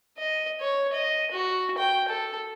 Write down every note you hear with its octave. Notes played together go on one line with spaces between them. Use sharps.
D#5
C#5
D#5
F#4
G5
A4